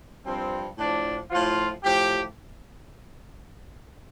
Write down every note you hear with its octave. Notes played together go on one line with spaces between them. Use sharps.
G2 F3 C4
A2 F3 D4
A2 F3 F4
A2 F3 G4